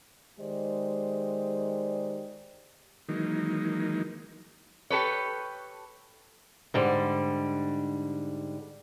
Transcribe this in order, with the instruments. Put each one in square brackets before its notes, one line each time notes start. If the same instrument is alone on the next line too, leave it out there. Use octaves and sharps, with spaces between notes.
[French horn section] D#3 G#3 G4 C5 D5 D#5
[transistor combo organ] D#3 E3 F#3 G#3 A#3 D#4
[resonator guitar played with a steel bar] G4 A4 B4 C#5
[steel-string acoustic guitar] G#2 D3 G3